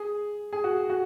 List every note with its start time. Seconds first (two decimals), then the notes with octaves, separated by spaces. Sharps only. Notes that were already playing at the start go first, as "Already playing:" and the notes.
Already playing: G#4
0.53 G#4
0.64 F#4
0.90 F#4